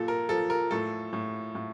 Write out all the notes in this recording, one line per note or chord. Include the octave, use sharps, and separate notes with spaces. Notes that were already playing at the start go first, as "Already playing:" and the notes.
Already playing: A#2 F3 A4
A#4
F3 A4
A#4
A2 A4
A2
A2